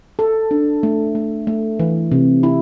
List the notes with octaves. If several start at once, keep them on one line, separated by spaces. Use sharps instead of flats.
A4
D4
A3
A3
A3
E3
C3
E4